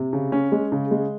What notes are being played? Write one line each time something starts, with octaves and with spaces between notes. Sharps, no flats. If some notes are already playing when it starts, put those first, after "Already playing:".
Already playing: C3
C#3
C#4
G#3
C#3
G#3